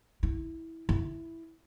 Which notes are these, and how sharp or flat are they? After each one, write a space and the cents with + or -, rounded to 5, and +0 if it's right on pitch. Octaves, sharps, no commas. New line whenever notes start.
E4 -15
E4 +0